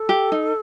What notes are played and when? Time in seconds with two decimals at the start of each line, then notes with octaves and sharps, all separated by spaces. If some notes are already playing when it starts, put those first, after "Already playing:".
Already playing: A4
0.09 G4
0.32 D#4